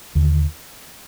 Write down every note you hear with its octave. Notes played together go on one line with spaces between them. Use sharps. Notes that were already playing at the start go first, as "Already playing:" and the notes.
D#2 D3